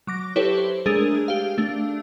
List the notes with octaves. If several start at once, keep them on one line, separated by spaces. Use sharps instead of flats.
F#3 D6 A#6
E4 G4 A4 B4 C#5
C5
G#3 A3 D4 G#4 A#4
G4 F5
A3 D4